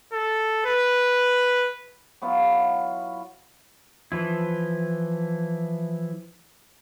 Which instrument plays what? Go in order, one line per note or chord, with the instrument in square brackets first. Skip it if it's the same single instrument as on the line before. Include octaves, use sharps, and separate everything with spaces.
[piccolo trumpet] A4
B4
[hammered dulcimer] F#3 B3 E4 F4
[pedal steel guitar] E3 F3 E4